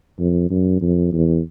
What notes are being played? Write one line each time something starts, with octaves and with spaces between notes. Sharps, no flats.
F2
F#2
F2
E2